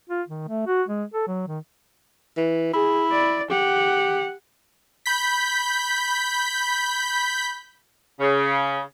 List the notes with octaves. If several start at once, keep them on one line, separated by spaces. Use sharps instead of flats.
F4
D#3
A3
F#4
G#3
A4
F#3
D#3
E3
E4 G#4
D5
G4 F#5
B5 G6 B6
C#3